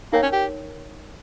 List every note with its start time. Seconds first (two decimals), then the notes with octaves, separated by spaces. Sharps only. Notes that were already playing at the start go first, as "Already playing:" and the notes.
0.13 A#3 D#4 A#4 C#5 G5
0.23 C#4
0.33 G4